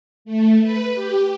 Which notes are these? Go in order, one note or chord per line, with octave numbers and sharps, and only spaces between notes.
A3
B4
G4